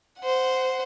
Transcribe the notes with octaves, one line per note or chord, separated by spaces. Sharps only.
C5 F#5